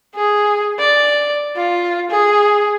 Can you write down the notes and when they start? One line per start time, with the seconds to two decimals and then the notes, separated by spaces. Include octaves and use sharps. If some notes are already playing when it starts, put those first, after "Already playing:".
0.15 G#4
0.79 D5
1.56 F4
2.11 G#4